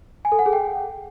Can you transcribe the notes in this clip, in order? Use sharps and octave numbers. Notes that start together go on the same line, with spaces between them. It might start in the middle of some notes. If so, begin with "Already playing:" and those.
G#5
A4
F#5
G#4
G5